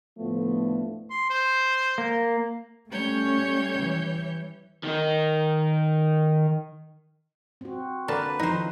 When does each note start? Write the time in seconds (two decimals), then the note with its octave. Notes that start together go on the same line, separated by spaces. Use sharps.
0.18 D2 A2 D3 F3 A3 B3
1.11 C6
1.30 C5
1.98 A#3
2.90 G3 A3 C#4 C#5 G6
3.78 E3
4.83 D#3 D#4
7.61 C4 F#4
8.08 D3 A#3 B4 A5
8.39 D#3 F3 D#4 E4 C5